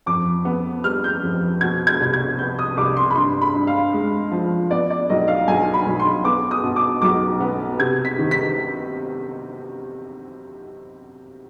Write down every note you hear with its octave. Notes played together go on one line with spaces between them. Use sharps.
F2 D6
B3
G3 F6
G6
F2
B2 G#6
G#6
C2
G#6
B3 G6
D#6
C2 D6
C6
B5
G2 C6
B5
G2
F5
G#3
F3
B3 D5
D5
B1 D#5
F5
B1 G#5
B5
B1
C6
B3 D6
D#6
B2
D6
B1 D6
B3
C3 G#6
B6
D#3
B6